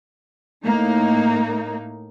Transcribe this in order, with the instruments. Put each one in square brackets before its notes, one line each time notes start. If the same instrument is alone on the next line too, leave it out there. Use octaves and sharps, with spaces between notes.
[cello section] A2 A#3 D#4